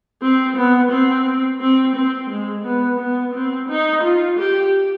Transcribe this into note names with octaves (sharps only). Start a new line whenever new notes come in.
C4
B3
C4
C4
C4
G#3
B3
B3
C4
D#4
F4
G4